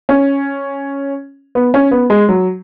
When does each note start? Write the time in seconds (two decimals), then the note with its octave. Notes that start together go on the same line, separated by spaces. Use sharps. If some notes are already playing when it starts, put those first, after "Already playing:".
0.09 C#4
1.55 B3
1.74 C#4
1.91 B3
2.10 G#3
2.29 F#3